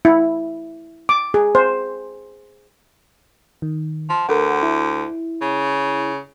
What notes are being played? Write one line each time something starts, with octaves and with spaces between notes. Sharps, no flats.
E4
D6
G#4
C5
D#3
F3
D2 A4 A#4 F#5
E4
C#3